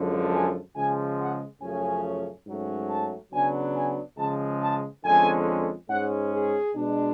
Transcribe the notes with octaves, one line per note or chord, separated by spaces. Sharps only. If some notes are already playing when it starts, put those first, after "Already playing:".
Already playing: F#2 D3 F3 G#3
G#5
C#3 F3 G#3 G#5
F#5
F#2 C#3 F3 A3 C#4 G#5
G#2 F#3 A3 C#4
A5
C#3 F#3 B3 D4 G#5
G#5
C#3 F3 G#3 A5
A5
F2 D3 G#3 C#4 G#5
G#2 G#3 C#4 F#5
G#4
B2 G#3 D4